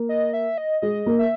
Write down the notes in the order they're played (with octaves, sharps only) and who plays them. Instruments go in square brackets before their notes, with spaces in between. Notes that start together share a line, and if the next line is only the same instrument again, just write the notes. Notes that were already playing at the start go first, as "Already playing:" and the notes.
Already playing: [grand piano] A#3
[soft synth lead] D#5
E5
D#5
[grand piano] G#3 [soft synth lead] D#5
[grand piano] A#3
[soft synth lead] E5